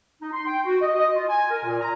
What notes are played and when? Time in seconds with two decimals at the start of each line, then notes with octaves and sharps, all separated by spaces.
0.22 D#4
0.33 C6
0.46 G5
0.65 F#4
0.81 D#5
0.94 D#5
1.15 F4
1.29 G#5
1.51 A#4
1.64 A#2
1.81 A#5